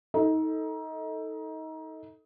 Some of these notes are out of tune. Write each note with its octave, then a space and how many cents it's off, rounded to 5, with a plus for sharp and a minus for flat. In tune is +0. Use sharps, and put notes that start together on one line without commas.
D#4 +25 A4 +5